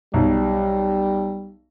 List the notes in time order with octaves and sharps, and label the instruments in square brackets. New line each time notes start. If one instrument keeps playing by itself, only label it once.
[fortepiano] B1 [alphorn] G3